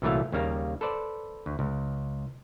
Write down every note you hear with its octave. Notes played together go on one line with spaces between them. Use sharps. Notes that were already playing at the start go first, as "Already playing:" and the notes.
C2 A#2 E3 F#3 A3 F5
D#2 C#3 G3 A#3 F5 A#5
A4 B4 C5 D5
D2
C#2